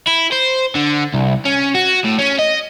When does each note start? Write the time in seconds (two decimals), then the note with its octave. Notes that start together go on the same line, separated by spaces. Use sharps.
0.07 E4
0.32 C5
0.75 D3
1.14 C2
1.45 C#4
1.74 F#4
2.04 A2
2.19 C#4
2.39 D#5